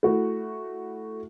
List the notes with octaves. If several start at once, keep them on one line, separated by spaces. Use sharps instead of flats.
A3 E4 F#4